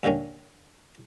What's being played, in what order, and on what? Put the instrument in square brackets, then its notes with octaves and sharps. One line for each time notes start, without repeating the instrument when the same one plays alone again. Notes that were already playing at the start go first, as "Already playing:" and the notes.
[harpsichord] D#2 A#2 D3 D#3 C#4